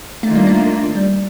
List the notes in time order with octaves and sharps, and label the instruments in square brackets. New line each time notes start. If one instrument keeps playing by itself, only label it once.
[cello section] D#3 A#3 D4 F4 [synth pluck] A3
[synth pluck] G3
A3
G3